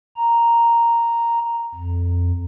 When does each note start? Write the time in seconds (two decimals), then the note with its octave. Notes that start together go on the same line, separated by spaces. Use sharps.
0.16 A#5
1.74 F2